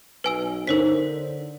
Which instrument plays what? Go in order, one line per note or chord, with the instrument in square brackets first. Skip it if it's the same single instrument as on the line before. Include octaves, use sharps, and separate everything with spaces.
[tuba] B1 [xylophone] B4 G#5 E6
[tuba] D3 [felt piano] D#4 C5 [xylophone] A#4 C#5 B6